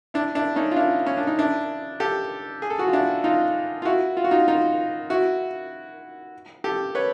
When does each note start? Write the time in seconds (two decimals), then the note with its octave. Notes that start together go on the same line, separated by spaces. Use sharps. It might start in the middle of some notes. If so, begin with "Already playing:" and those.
0.14 D4 E4
0.35 D4 E4
0.56 C#4 D#4
0.71 F4
0.76 D4 E4
1.07 C#4
1.17 D4
1.27 D#4
1.39 D4 E4
2.00 G4 A4
2.62 G#4
2.70 A4
2.79 F#4 G#4
2.88 F4
2.93 D4 E4
3.24 D#4 F4
3.82 F4
3.85 E4 F#4
4.17 F4
4.24 F#4
4.31 D#4 F4
4.48 D#4 F4
5.10 E4 F#4
6.64 G4 A4
6.95 B4 C#5